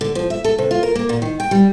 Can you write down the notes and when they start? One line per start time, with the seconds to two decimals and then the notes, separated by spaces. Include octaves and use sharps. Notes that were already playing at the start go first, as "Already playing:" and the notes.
0.01 D3
0.15 F3
0.30 E5
0.44 A4
0.58 C3
0.71 F4
0.83 A#4
0.95 A#3
1.09 A#2
1.22 D#3
1.40 G5
1.51 G3